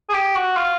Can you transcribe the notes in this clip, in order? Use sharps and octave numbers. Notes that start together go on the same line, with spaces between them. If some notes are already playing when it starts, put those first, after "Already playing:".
G#4
G4
F#4
F4